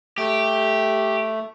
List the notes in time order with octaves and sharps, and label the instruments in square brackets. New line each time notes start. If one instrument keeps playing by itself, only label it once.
[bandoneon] A3 [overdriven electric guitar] G4